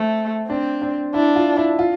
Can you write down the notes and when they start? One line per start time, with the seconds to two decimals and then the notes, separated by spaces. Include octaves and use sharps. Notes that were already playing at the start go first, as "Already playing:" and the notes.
Already playing: A3 C4
0.49 C4 D4
0.82 D4
1.14 D4 E4
1.36 F4
1.57 E4
1.79 F4